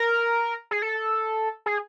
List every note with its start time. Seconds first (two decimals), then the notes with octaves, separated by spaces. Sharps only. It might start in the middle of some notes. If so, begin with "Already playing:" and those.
Already playing: A#4
0.71 G#4
0.82 A4
1.66 G#4